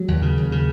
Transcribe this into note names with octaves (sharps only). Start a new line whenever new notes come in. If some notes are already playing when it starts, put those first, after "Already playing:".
Already playing: F#3
D#2
C#3
D#2
C#3